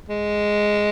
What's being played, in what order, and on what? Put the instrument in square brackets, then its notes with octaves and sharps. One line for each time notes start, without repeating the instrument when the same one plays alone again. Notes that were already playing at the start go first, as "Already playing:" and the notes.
[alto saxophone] G#3